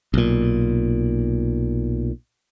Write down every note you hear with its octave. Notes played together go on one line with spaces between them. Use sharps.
B1 A#2